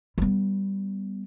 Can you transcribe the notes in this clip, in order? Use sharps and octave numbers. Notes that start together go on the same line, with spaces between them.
G3 B3